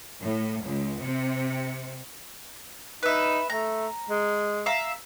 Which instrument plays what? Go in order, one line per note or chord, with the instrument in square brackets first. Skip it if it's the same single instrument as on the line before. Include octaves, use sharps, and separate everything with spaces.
[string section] A2
C#2
C3
[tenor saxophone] D#4 [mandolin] B4 E5
[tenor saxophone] A3 [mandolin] A#5
[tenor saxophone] G#3
[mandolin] E5 F5 A#5